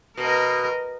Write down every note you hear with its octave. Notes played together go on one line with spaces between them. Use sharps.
B2 A#4 D#5